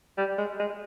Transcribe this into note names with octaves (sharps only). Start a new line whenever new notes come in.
G3
G#3
G#3